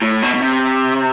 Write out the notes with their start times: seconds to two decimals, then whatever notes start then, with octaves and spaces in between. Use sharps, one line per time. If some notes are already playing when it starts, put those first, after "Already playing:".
0.02 A2
0.22 B2
0.34 B2
0.42 C3